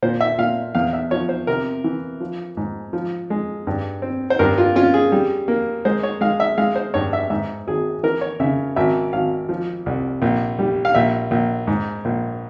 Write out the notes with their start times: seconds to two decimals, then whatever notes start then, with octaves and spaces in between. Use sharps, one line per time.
0.02 A#2 C5
0.21 E5
0.38 A#2 F5
0.75 E2 F5
0.93 E5
1.11 F3 C#5
1.29 C5
1.47 C3 A#4
1.84 E3
2.20 F3
2.57 G#2
2.93 F3
3.30 G#3
3.67 G2
4.02 C4
4.30 C5
4.39 G2 A#4
4.58 F4
4.76 C#4 F4
4.94 G#4
5.12 G3
5.48 A#3
5.85 G#3 C5
6.03 C#5
6.21 G#3 F5
6.40 E5
6.58 G#3 F5
6.76 C5
6.94 G2 C#5
7.13 E5
7.30 G#2 E5
7.67 G#1 G#4
8.03 E3 A#4
8.21 C#5
8.40 C#3 E5
8.76 G#1 E5
9.13 G#1 F5
9.49 F3
9.86 C2
10.22 A#1
10.59 G3
10.85 F5
10.94 A#1 E5
11.31 A#1
11.67 G#2
12.05 A#1